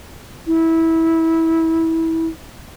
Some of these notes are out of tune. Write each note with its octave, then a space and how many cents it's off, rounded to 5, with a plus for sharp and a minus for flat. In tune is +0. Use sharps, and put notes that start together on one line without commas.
E4 -20